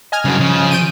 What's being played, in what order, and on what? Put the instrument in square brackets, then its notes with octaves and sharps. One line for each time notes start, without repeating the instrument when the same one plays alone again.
[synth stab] D#5 G#5 F6
[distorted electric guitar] G2 [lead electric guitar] C#3 F#3
[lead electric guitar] C#3 [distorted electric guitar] F3
[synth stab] G6 D7 D#7